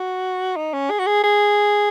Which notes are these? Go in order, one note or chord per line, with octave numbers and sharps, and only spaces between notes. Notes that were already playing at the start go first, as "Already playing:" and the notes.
Already playing: F#4
D#4
C#4
G#4
F#4
G#4
G#4